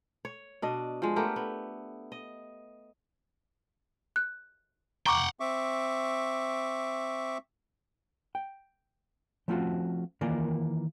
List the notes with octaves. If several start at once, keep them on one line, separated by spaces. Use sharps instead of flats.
C#5
B2 D4 D#5
F3 G#3
A3 B3 G4 A#4
B3
D#5
F#6
F#5 G5 A#5 C#6 D6
C4 E5 C#6 D6
G5
F3 A3 C4 C#4 F4 F#4
D#3 E3 A#3 F4 A#4 D5